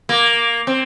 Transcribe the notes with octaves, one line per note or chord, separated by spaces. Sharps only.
A#3
C4